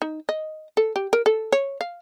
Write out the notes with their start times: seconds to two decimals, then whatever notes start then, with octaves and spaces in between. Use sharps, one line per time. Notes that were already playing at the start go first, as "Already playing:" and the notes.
0.02 D#4
0.29 D#5
0.77 A4
0.96 G4
1.13 A#4
1.26 A4
1.52 C#5
1.81 F5